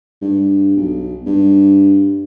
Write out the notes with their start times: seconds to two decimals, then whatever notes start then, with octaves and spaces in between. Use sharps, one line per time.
0.22 G2
0.77 B1
1.26 G2